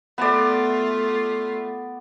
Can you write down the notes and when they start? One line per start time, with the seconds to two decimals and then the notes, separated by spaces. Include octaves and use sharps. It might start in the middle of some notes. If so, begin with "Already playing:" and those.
0.18 A3 B3 F4 D5